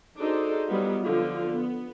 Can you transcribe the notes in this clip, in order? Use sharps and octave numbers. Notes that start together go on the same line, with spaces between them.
D4 D#4 F#4 G#4 A4 C5
F#3 G3 B3 D#4 F4
D3 F3 B3 F4
B3